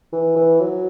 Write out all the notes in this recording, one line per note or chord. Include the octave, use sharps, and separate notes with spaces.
E3
E3
F#3